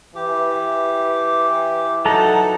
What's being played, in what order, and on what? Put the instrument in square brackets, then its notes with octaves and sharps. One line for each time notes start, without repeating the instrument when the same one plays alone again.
[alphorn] E3 [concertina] G4
[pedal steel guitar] F#3 A4 A#5 [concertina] D#4 F#5